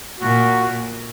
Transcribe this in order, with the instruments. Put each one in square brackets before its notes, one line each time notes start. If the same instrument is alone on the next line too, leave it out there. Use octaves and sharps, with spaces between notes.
[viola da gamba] A#2 [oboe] F#4